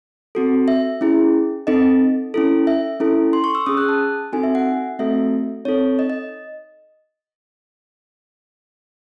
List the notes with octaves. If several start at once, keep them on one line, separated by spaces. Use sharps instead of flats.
C4 F#4 A4
E5
C#4 E4 G#4
C4 D#4 A4 D#5
C#4 E4 A4
E5
C#4 E4 A4
C6
C#6
E6
C#4 G#4 D#6
F#6
A5
C4 D#4 F#4 A4 G#5
E5
F#5
A3 C4 F#4 A4 E5
C4 D#4 A4 C#5
D#5
D#5